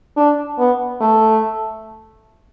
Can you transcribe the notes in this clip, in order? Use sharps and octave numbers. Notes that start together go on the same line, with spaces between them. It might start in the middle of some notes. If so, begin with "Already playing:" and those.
D4
B3
A3